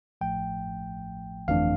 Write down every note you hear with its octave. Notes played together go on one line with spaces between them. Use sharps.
A1 A2 F3 A3 G5
G1 F2 E3 A3 D4 F5